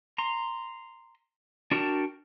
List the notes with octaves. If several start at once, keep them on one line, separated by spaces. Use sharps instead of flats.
A#5 C6
D4 F#4 A#4 G5 A5